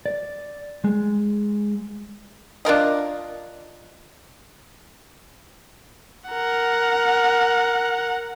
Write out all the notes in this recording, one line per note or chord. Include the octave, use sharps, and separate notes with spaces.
D5
G#3
D4 F4 A#4 D#5
A#4 F#5